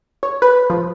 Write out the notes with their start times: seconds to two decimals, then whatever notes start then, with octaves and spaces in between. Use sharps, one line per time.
0.23 C#5
0.42 B4
0.70 F3